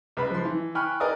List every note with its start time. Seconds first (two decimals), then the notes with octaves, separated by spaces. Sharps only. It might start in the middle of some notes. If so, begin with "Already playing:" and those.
0.17 C#2 B4 B5
0.30 F3 C6
0.45 E3
0.75 G5 G#5 B5 C#6 F6 F#6
1.00 A#4 B4 D5 D#5 G#5 D#6